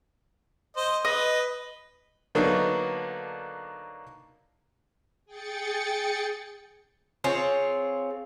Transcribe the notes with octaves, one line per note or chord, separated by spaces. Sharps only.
C5 D#5
B4 D#5
D3 F#3 A#3 B3 D4 D#4
G#4 G5 A6 C#7
C4 F4 G#4 C#5